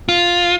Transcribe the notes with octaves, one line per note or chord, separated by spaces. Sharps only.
F4